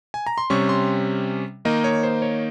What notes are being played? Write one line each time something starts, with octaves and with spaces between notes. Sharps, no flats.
G#5
A#5
C6
C3 G3 C#4 C#6
C6
D#3 A#3 D#4 D#5
C#5
C5
C#5